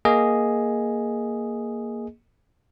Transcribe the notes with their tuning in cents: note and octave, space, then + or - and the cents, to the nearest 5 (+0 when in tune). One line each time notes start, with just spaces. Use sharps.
A#3 +0 G#4 +0 D#5 +0